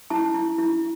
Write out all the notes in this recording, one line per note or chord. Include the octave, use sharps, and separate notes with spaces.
E4 A5
E4
E4